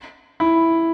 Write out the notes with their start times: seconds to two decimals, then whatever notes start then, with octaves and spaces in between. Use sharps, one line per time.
0.40 E4